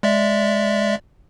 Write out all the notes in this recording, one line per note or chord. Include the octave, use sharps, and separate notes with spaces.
G#3 D5 E5